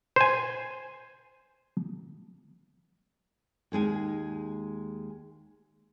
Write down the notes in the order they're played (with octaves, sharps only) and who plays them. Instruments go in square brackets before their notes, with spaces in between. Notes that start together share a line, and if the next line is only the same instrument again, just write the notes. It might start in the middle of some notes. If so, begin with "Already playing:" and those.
[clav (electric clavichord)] C5 G#5
[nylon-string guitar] D#2 G#3 G#4 G#5